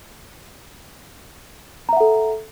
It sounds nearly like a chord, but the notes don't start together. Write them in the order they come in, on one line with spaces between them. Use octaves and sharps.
A#5 E5 F#5 A4